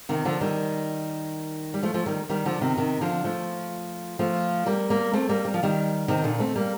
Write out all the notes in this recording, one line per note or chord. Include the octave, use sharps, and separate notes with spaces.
C3 D#3
D3 F3
D#3 G3
G3
F3 A3
F3 A3
D#3 G3
D#3 G3
D3 F3
C3 D#3
C3 D#3
D3 F3
F3 A3
F3 A3
G3 A#3
G3 A#3
A3 C4
G3 A#3
G3
F3
D#3 G3
C3 D#3
A#2 D3
A3 C4
G3 A#3